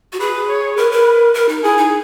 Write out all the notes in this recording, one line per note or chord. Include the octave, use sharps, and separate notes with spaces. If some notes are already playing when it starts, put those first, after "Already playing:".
F#4
G#4 B4
C#5
A#4 B4
A#4
A#4
D#4
E4 G#4
D#4